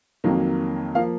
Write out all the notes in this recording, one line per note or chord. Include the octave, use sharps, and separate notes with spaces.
F2 D#3 F#3 A#3
F3 A#3 F5